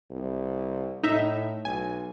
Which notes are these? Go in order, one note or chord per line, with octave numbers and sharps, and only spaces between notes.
C2
A2 D#4 E5
B1 G#5